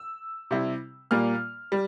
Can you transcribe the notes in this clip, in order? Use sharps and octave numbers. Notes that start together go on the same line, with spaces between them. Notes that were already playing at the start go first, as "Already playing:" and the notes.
Already playing: E6
C3 G3 C4 E4
A#2 G3 A#3 F6
G3